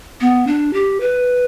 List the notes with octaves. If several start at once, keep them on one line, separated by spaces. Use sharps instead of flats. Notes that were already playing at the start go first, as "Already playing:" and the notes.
B3
D4
G4
B4